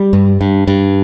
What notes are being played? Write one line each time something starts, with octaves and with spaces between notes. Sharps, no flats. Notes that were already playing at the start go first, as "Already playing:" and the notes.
Already playing: G3
G2
G2
G2